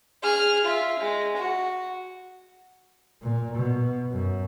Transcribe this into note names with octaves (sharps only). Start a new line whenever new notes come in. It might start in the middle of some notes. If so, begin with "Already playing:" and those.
G#4 F6
F4 E5
G#3
F#4
A#2
B2
F#2